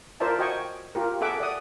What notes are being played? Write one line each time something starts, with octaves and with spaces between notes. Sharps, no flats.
F4 A#4 C5 D5 E5 A5
F#4 D#5 G5 G#5 C#6
F4 G4 A#4
G#4 A4 E5 F#5 D6
D5 F#5 D#6